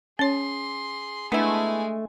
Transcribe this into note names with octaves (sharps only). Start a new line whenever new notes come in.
C#4 G#4 C#5 C6
G#3 A3 B3 D4 E4 G#5